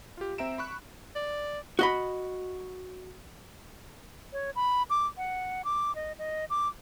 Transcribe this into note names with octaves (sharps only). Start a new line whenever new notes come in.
F4 G4
C4 E5 A#5 D7 E7
B5 C#6 F#6
D5
F#4 D#5 B5
C#5
B5
D6
F#5
D6
D#5
D#5
D6